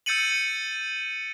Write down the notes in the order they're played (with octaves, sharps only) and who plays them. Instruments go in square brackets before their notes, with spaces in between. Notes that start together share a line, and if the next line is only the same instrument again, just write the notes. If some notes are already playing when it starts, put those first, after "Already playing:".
[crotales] E6 G6 A6 C#7 D#7 F#7